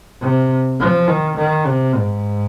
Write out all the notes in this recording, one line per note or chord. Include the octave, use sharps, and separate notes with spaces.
C3
F3
D#3
D#3
C3
G#2